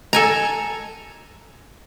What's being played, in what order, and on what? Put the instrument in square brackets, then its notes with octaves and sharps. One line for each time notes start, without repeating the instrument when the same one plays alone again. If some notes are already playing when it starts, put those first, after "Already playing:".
[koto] A4 G#5 A#5